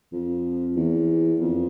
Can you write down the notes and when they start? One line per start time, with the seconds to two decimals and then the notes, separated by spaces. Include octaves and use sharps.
0.12 F2
0.76 E2
1.40 F2